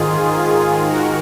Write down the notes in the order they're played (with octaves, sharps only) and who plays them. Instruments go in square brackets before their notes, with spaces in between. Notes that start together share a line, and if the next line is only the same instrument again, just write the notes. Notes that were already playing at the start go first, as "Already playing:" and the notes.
Already playing: [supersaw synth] G#2 D#3 F4 G#4
F#4 A#4